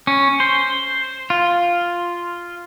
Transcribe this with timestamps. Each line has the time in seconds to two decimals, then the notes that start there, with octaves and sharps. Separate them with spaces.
0.07 C#4
0.40 C5
1.30 F4